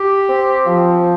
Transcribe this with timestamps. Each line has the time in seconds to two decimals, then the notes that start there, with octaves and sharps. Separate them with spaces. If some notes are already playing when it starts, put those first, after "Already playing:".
Already playing: G4
0.29 C4
0.65 F3